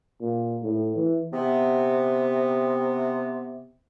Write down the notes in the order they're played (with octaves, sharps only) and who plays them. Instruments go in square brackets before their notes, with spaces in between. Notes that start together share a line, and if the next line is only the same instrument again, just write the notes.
[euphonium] A#2
A2
E3
[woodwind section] C3 B3